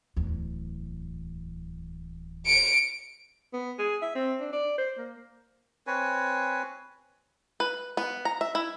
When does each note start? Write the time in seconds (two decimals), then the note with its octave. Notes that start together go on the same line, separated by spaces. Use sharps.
0.17 D1 E2
2.46 C#7 D7
3.53 B3
3.79 G#4
4.02 E5
4.15 C4
4.40 D4
4.53 D5
4.78 C5
4.98 A#3
5.87 C4 B4 C#5 G#5
7.60 B4
7.97 B3
8.25 A#5
8.41 E5
8.55 E4